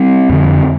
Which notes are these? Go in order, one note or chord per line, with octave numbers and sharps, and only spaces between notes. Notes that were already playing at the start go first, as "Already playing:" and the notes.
Already playing: G3 C4
F2 D3